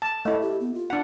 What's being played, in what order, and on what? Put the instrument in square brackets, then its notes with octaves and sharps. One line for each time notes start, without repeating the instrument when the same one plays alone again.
[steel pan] A5
[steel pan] A3 E4 [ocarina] D#5
[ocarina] G4
B3
F4
[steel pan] D4 F#5